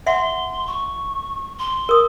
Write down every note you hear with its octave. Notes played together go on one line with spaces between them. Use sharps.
E5 F#5 C6
C#6
C6
A#4 D#6